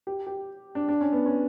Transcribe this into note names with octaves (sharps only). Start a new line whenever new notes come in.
G4
G4
D4
D4
C#4
B3
C#4